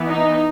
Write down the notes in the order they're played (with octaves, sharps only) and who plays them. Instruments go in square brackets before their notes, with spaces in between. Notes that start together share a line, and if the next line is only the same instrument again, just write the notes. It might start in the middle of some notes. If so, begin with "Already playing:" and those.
Already playing: [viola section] E3 B3
D#4